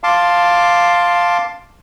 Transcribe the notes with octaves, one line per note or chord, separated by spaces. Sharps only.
F5 A5 C6 D6